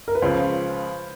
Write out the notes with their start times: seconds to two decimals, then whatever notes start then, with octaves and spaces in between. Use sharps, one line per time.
0.08 A#4
0.15 B4
0.22 C#2 C#3 F3 C5